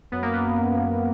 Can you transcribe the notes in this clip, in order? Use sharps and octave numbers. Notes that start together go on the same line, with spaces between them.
F#2 B3
A#3
B3